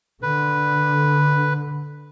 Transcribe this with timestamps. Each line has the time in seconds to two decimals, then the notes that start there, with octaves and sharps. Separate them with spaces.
0.22 D3 B4